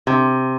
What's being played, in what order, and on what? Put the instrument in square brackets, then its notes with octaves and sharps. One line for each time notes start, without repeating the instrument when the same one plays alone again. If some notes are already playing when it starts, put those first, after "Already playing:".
[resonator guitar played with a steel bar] C3